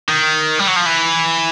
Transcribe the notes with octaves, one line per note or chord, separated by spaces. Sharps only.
D#3
G3
F#3
F3
E3